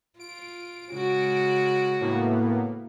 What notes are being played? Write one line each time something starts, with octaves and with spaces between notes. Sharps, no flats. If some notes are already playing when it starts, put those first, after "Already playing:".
F4 D7
C#3 G#3 F#4
A2 A#3 B3